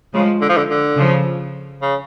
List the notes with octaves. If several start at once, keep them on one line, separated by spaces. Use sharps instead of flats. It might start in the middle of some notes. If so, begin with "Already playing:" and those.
C#3 F3 G#3
D3
F3
D3
D3
C#3 F3
C#3